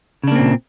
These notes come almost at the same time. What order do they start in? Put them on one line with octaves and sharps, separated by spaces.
C#3 D4 A#3 C4 A#2